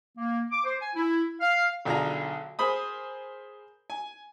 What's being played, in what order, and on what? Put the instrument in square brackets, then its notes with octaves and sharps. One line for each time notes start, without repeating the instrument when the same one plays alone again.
[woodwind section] A#3
D6
C5
G#5
E4
F5
[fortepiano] B1 D3 F4 G#4 A#5
G#4 A#4 C5 B5 D#6
G#5